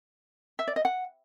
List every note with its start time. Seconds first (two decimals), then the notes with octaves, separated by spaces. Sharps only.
0.59 E5
0.68 D5
0.76 D#5
0.85 F#5